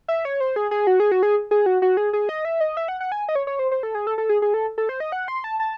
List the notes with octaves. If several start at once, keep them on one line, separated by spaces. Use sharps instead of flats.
E5
C#5
C5
G#4
G#4
F#4
G#4
F#4
G#4
G#4
F#4
F#4
G#4
G#4
D#5
E5
D#5
E5
F#5
F#5
G#5
D#5
C#5
C#5
C5
C5
A4
G#4
A4
A4
G#4
G#4
A4
A4
C5
D#5
F#5
C6
A5
A5